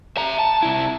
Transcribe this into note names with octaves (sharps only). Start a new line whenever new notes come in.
E5 A#5
A5
C3 E4